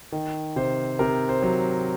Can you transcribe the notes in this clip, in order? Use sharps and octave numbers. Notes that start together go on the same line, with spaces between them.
D#3
C3 C5
C3 A#4
C5
F#3